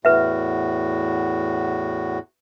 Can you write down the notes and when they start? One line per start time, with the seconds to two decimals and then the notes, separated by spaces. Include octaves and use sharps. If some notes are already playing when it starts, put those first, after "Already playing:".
0.05 E2 A2 F#4 B4 E5